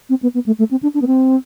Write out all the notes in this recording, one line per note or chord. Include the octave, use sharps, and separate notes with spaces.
C4
B3
B3
A3
A3
C4
D4
D4
B3
C4